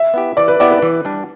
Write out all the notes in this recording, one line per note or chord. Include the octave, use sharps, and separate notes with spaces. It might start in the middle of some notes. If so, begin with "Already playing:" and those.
Already playing: E5
B3 E4 G4
E3 D5
B4
B3 E4 G4 D5
B4
E3
G3 D4